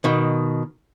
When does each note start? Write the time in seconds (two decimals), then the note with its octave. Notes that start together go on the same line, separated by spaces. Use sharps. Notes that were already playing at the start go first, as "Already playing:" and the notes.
0.04 B2 D#3